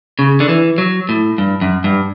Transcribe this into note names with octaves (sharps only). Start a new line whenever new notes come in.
C#3
D3
E3
F#3
A2
G2
F#2
G2